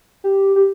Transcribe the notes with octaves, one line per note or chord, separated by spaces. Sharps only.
G4
G4